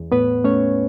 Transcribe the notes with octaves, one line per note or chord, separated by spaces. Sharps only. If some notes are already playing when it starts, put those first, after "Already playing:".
Already playing: E2
A2 B3 B4
A3 C#4 C#5